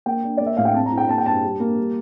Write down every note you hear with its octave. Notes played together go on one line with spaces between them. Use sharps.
A#3 G5
D4
A#3 D5
E5
A2 F5
G5
C4 A5
A#5
E4
G5
A#3 A5
G5
G2 A5
G3
A#3
G3